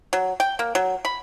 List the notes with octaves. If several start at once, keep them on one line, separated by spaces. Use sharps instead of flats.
F#3
G5
A#3
F#3
B5